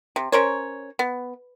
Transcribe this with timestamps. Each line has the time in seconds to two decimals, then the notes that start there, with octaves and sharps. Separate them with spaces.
0.16 C3
0.32 C#4 A#4 C5 C#5
0.99 B3